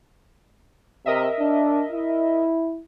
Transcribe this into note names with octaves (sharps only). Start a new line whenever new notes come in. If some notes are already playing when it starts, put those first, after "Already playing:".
C3 A#4 D#5 E5
D4
E4